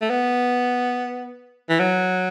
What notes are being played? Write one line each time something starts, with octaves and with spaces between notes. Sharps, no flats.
A3
B3
E3
F#3